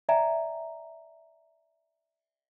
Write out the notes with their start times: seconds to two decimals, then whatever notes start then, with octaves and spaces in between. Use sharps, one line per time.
0.09 D5 E5 G5 G#5 A#5